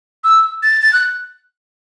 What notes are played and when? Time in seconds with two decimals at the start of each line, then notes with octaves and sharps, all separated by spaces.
0.24 E6
0.63 A6
0.82 A6
0.93 F#6